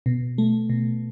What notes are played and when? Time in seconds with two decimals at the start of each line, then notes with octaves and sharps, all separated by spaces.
0.06 B2
0.38 A3
0.70 B2